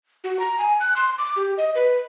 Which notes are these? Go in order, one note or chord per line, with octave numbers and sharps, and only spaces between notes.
F#4
A#5
G#5
F#6
C6
D6
G4
D#5
B4